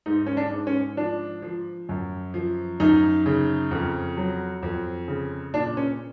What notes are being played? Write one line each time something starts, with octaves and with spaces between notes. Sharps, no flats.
G#2 D#4
C#4
D4
G#2
C#4
F3 D4
F3
F#2
F3
F#2 D#4
C#3
F2
F#3
F2
C#3
A#2 D4
C#4